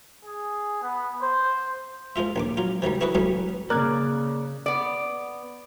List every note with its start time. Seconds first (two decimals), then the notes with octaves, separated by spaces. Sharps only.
0.25 G#4
0.82 B3
1.21 C5
2.16 F3 G#3 F4 E5
2.36 A#1 D#2 D6
2.57 F#3 F4
2.82 C3 D#3 F#3 G3
3.01 B3 E4 F#4 G#4 B4 C#5
3.15 B2 E3 F#3 G3 A3 C#4
3.70 C#3 A#3 A#4 D5 D6 F#6 G#6
4.66 B3 D5